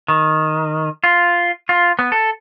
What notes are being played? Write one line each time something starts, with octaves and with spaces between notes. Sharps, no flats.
D#3
F4
F4
B3
A4